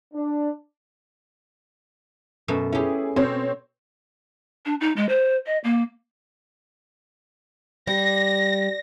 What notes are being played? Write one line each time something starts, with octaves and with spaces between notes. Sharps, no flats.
D4
F#2 B2 A3
C#4 E4 G4 G#4
B2 C4 C#5
D4
D#4
G#3
C5
D#5
A#3
G3 A#6